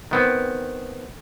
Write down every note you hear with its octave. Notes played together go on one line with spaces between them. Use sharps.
D#3 B3 C4